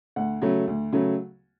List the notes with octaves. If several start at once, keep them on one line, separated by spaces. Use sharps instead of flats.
D2 F#5
C#3 F#3 A3
D2
C#3 F#3 A3